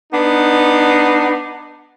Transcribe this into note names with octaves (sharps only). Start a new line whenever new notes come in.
B3 D4 D#4